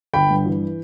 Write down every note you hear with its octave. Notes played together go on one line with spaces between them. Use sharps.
G1 G5 B5
G2
E3